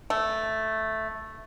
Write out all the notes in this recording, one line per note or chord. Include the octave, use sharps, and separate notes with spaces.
A3